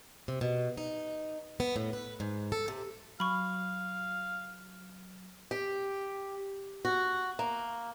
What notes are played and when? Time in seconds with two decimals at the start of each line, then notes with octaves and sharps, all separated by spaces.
0.28 C3
0.41 B2
0.77 D#4
1.60 B3
1.76 A2
1.93 B4
2.20 G#2
2.52 A4
2.68 C3
3.20 F#3 F5 B5 C#6
5.51 G4
6.85 F#4
7.39 A#3